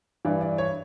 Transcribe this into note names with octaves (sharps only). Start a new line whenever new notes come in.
G2 E3 D5
D5
C#5